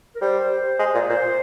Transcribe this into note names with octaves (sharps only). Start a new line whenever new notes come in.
A#4
G3 C5
G#3
A#2
A#2 C5